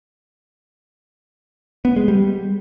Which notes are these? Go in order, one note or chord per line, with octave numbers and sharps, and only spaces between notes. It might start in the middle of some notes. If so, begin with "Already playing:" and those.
B3
G#3
G3